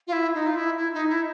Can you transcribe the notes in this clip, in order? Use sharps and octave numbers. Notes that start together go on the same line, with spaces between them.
F4
E4
D#4
F4
E4
E4
D#4
E4